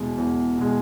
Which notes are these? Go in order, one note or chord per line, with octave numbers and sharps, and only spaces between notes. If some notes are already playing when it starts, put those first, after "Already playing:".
Already playing: E2 B2 G#3
E2
B2 G#3